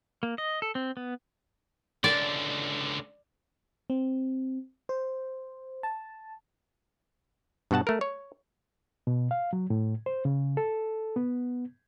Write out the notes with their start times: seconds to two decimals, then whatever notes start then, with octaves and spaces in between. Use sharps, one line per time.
0.23 A#3
0.38 D#5
0.62 A4
0.75 C4
0.97 B3
2.04 C#2 D3 D5
3.90 C4
4.89 C5
5.83 A5
7.71 G2 B2 F#4 F#5 A5
7.87 A3 A#4
8.01 C#5
9.07 B2
9.31 F5
9.53 F#3
9.70 A2
10.06 C5
10.25 C#3
10.57 A4
11.16 B3